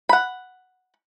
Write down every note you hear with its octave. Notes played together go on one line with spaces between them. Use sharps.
F#5 B5